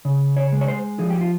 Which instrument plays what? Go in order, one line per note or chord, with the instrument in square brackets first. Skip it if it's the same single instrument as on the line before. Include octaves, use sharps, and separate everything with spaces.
[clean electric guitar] C#3
C#5
G#3
C#5
C5
F3 G#4
G4
F4